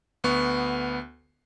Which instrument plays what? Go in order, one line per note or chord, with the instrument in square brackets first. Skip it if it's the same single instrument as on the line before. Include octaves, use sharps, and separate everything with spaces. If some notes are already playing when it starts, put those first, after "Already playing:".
[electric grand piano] D2 B3 C#6